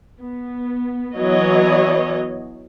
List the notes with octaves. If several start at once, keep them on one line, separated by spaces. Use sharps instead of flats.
B3
E3 F#3 B3 C#5 D#5